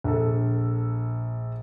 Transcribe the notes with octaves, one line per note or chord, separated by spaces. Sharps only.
A#1 A4